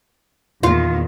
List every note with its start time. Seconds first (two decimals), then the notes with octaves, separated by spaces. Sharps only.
0.63 E2 A#2 D#3 F4